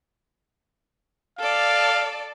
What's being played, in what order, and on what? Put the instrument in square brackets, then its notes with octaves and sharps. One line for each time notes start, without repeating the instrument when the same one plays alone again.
[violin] A4 D5 [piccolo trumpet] F5